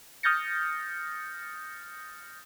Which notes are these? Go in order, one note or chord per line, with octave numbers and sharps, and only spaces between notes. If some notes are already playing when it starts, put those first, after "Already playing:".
D#6 F6 G6 A6 A#6 C#7